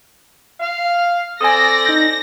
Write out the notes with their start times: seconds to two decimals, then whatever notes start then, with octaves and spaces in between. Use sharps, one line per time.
0.60 F5
1.41 C4 A4 D5 G#5 D#6 A#6
1.86 D#4 G6